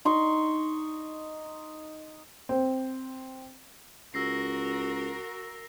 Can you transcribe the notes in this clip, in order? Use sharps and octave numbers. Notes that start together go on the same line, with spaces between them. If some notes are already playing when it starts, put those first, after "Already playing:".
D#4 C6 C#6
C4
C#2 F#4 A#4 E6 A#6 C7